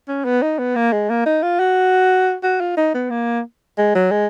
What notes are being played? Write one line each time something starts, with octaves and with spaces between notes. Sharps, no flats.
C#4
B3
D#4
B3
A#3
G#3
A#3
D#4
F4
F#4
F#4
F4
D#4
B3
A#3
G#3
F#3
G#3